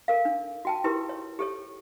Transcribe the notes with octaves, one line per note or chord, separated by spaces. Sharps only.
A4 A#4 F5
D4
F#4 G5 A5
E4 G4 A#4 B4 C6
C#5
G4 A4 C#5